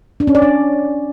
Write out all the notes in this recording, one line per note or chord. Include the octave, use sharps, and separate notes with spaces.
D4
C#4
D5
D4